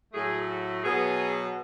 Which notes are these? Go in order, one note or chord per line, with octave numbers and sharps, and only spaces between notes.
A2 F#3 A3 G#4
F#4
B2 F#3 B3 G#4